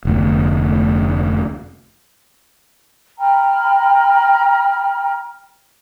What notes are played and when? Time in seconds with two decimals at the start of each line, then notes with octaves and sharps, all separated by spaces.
0.05 F1 D2
3.19 G5 A#5 B5 F6